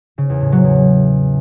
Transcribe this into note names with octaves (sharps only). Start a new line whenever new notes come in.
C#3
E2
A2
F#3
E2